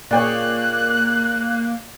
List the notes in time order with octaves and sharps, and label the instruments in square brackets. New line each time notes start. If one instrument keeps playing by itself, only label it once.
[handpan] A#2 G#4 C#5 [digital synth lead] A#3 [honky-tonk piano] D5 G5 [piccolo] F#6